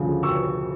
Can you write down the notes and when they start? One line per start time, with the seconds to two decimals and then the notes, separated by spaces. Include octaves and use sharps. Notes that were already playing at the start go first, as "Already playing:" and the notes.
Already playing: D2 C#3 F3
0.23 C#6 E6